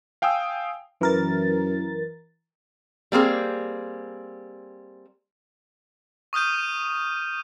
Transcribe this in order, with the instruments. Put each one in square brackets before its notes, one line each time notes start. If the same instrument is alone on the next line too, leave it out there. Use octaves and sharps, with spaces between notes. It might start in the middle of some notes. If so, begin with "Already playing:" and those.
[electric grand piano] F5 G5 G#5 D#6 E6
[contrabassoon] F#2 [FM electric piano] E3 A#4 A6
[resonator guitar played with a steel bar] G3 A#3 C4 G#4
[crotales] C#6 D#6 F6 G6 D#7